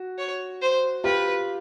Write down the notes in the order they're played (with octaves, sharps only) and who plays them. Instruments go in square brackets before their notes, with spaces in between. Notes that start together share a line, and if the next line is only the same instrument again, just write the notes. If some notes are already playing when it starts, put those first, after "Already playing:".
Already playing: [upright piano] F#4
[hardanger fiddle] C#5
C5
[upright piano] F4 G4 [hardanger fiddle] B4